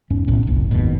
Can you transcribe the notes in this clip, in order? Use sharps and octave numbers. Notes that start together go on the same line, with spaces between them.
E1 G#2 C#4
B1 A2 C#4
F#1 C2
F#1 D#2 G#2 B2